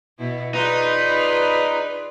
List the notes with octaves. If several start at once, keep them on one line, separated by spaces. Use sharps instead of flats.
B2 E4
D#4 F4 G#4 B4 D5